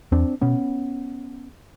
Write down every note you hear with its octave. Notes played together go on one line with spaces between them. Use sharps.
E2 C4 D4
B2 B3 C#4